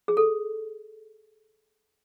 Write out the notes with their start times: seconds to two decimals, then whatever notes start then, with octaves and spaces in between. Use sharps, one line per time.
0.08 G#4
0.17 A4